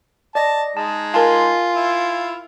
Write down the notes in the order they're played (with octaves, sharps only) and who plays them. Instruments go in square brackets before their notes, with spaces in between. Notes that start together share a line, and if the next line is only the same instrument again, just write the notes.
[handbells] D5 D#5 A#6 [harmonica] A5
[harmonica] G#3 D#4 [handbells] A5
[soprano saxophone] F4 [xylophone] A#4 A5 [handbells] G#5 C6
[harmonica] E4